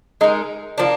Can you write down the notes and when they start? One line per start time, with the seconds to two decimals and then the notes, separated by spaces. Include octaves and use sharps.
0.21 G#3 D#4 A#4
0.78 F3 A#3 D4